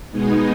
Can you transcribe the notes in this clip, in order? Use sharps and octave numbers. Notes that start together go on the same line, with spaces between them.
B2 G#3 B3 D#4 G#4